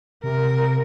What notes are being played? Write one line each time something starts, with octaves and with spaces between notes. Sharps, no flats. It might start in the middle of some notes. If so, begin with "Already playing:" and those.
C3 A#4